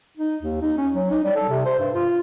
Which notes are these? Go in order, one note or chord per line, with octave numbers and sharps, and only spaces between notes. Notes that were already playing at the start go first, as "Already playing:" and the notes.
D#4
D#2
D#4
C#4
F#3
D#4
G3
A4
C3
C5
G2
F4